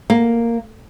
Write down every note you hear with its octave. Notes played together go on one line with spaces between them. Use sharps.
A#3